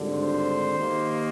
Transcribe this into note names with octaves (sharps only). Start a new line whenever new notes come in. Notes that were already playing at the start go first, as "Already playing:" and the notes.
Already playing: G#1 G2 D3
C5
D#2 D#3 A#3